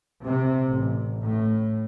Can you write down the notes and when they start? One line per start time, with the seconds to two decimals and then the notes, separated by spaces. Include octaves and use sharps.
0.24 C3
0.67 A1
1.23 A2